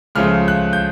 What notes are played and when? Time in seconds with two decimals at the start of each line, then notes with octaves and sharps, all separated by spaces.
0.15 C#2 C#3 F3 A3 F6
0.48 F#6
0.73 G6